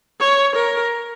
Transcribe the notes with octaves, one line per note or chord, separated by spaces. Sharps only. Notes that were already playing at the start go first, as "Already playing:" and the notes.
C#5
A#4